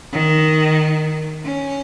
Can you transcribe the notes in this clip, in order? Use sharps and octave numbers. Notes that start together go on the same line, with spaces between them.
D#3
C#4